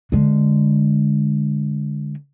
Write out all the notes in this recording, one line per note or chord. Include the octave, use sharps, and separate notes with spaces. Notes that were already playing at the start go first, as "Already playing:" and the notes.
D3 G#3